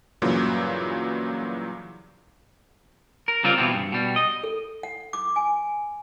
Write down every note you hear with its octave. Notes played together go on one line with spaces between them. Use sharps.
G2 A#2 C#3 E3 F#3
A#4
C#3 G3 C4 F4 G4 A#4
B2 E3 B3 C4
G2
B2 G3
D#5
A4
F#5
D6
G#5